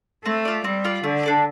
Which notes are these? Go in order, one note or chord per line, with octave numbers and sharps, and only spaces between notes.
A3 C4
F4 D5
G3 C4
F4 D5
D3 A3
D4 A4 D5